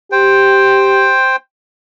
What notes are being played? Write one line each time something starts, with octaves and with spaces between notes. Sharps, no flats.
G4 C5 G5